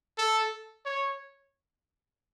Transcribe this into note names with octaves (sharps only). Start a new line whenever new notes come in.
A4
C#5